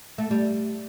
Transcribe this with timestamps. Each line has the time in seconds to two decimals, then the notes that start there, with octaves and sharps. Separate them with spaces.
0.18 A3
0.31 G3